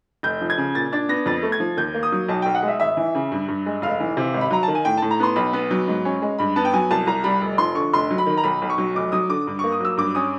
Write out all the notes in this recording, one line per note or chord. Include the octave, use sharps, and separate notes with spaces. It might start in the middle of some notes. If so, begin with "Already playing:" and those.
F1 G6
F3
G#6
C#3
A#2 A6
D4 A6
B3 A#6
F2 A6
A3
G#6
F3
D#2 G6
A#3
D#6
F#3
B1 A5
B1 G5
F#5
G#3
E5
G#1 E5
E3
C#3
G2
G2
G#3
F1 F5
E3
C3
G#1
B5
F#3 A#5
D#3 A5
G#5
A2 G5
A2 A5
A#5
B3 C6
B1 B5
B3
F#3
G#2
C#4
G#3
G2 B5
B3 A5
G5
F#3 G#5
C2 A5
C2 A#5
G3 B5
F1
F3 C6
D3 C#6
F1 C6
F#3
B5
D#3
A#5
B1 B5
B1
C#6
F#3
F1 D6
F#3 D#6
D3 D6
G2
A#3 C#6
D#6
F#3 E6
G2 D6
C#4 D#6